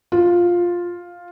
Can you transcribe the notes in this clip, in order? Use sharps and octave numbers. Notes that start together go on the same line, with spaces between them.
F4